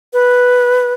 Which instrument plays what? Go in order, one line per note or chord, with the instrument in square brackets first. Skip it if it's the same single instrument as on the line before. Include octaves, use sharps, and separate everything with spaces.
[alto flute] B4